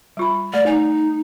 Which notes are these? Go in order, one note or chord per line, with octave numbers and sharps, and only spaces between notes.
G3 F4 B5
A3 D5
D#4 G#5